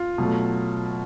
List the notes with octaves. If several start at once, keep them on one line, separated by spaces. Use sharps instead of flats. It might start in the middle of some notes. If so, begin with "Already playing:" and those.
Already playing: F4
B2 F#3 A3